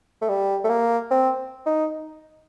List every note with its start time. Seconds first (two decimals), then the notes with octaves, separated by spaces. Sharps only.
0.22 A3
0.29 G3
0.64 A3
0.69 A#3
1.11 C4
1.66 D#4